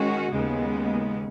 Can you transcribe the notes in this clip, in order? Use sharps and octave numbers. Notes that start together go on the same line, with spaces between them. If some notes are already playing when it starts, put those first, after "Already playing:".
Already playing: D#3 G#3 C#4 F#4
D#2 C#3 G#3 B3